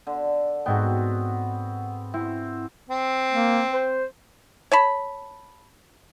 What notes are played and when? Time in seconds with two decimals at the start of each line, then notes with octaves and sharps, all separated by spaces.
0.07 D3
0.66 G#2 B3 C4 F#4 G5
2.14 C4 E4
2.89 C4
3.31 A#3
3.72 C5
4.72 C#5 A5 B5